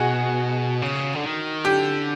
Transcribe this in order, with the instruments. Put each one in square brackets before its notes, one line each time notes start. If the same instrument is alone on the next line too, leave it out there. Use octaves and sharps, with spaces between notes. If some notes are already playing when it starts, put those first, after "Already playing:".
Already playing: [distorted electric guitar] B2 [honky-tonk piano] F#4 G#4
[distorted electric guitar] C#3
D3
D#3
[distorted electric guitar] D3 [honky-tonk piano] G4